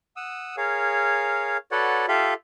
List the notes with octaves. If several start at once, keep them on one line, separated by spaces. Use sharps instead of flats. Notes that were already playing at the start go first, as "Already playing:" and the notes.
F#5 D#6 E6
G#4 A#4 C#5 F5
F#4 A4 B4 C#5 D5 F#5
F4 G4 A4 E5 F5